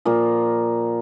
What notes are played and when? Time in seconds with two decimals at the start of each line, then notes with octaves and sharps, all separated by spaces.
0.05 A#2 F3 A#3